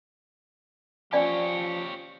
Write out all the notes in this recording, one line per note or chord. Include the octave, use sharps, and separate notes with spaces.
F3 C#4 G4 C#5 D5 G#5